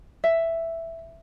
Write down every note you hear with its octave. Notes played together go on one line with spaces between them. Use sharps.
E5